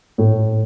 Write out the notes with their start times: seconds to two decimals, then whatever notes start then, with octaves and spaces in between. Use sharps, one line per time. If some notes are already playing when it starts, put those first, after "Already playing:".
0.18 A2